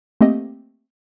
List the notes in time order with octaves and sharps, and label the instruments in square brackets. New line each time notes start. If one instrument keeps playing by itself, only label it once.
[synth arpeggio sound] A3 A#3 C4 G4 D#5